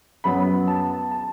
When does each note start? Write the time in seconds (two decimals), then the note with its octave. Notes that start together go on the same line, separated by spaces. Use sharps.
0.24 F#2 F#3 B3 B5
0.67 A5
1.11 A5